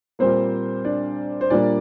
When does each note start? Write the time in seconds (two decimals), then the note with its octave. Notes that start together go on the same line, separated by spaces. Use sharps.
0.19 A#2 G3 A#3 C4 C5
0.85 D4 D5
1.41 C5
1.50 A#2 G3 A#3 D4 D5